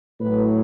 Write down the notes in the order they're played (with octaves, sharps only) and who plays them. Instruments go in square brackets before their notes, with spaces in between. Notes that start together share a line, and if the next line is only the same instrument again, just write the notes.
[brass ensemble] A2 F#3 B4